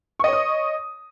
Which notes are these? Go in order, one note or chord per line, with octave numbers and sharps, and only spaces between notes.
C#5 D#5 C#6 D#6